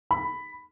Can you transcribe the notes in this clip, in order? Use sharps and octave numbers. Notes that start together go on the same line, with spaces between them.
B5